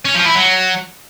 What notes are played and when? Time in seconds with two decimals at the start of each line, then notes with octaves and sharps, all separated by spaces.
0.05 C#4
0.15 F3
0.25 E4
0.35 F#3